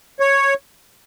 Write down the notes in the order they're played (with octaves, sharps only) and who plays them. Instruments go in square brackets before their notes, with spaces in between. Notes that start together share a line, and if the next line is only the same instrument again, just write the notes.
[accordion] C#5